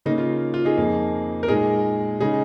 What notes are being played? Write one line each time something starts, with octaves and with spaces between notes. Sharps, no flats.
C#3 A#3 D#4
F4
F4
D#4 G#4
F2 F3 A#3
A#4
A#2 G#3 D#4 G#4
C#3 G#3 D#4 G#4